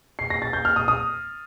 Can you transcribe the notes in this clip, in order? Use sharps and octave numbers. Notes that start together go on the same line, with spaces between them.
C7
A#6
A6
G6
F6
D#6
D#6